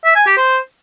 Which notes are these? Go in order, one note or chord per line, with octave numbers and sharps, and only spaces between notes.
E5
G#5
G4
C5